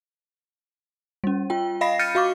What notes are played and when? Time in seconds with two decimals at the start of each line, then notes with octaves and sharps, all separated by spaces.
1.24 G3 C#4
1.50 F4 G5
1.81 D#5 F5 B5 A#6 C7
1.99 F6 G6 A6 C#7 D#7
2.15 F#4 F5 C#6 D6